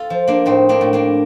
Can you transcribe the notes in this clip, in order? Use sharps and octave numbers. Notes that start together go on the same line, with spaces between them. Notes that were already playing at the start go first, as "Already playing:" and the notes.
Already playing: F4 A4
F3
A#3 D4
A2 C4 D#4
A#3 D4
A2
A#3 D4